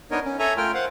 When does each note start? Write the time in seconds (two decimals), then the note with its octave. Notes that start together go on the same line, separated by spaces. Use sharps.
0.11 B3 D4 D#4 A#4 C#5 D#5
0.25 C#4
0.39 A4 C#5 E5 G#5 A#5
0.57 A3 F4 A#4 G5 F6
0.74 C5 F5 F#5